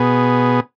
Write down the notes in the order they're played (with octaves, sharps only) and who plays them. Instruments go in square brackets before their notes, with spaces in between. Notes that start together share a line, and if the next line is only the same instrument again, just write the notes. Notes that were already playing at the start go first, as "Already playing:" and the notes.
Already playing: [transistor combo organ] B2 B3 G#4